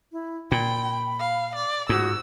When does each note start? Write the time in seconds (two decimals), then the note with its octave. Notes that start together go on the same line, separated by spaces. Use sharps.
0.11 E4
0.52 A#2 G5 B5
1.20 F5
1.55 D5
1.89 G#2 F4 F#4 D#6 E6